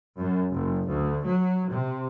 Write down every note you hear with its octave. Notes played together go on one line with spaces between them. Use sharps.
F#2
F#1
D2
F#3
C3